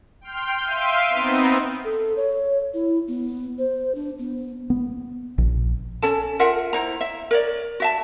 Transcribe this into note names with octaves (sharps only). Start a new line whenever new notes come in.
G5 C6 F6 G6
E5 F5 C6 D7 D#7
B3 C4 D#4
A4
C#5
E4
B3
C5
D4
B3
B3
A#1
C#4 A4 A5
F4 A#4 E5 F#5
E4 C5 A#5
E5
A#4 C#5 D5
F#4 E5 A5